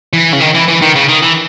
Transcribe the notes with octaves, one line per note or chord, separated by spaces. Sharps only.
E3
C#3
D#3
E3
E3
D#3
C#3
D#3
E3